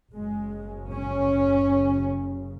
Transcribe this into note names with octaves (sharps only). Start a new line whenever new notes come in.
F#1 F#2 C#3 G#3
C#4